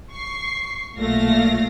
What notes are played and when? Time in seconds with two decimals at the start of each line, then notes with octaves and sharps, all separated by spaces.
0.11 C#6 C7
0.96 B1 A#2 A3 F5 A#6